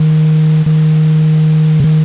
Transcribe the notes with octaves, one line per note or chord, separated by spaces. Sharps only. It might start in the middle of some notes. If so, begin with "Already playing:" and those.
Already playing: D#3
D#3
C#3
D#3